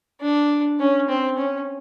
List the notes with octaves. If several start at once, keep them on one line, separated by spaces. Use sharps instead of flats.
D4
C#4
C4
C#4